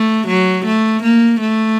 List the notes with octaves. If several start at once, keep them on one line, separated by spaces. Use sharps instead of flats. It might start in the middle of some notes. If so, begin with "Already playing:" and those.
Already playing: A3
F#3
A3
A#3
A3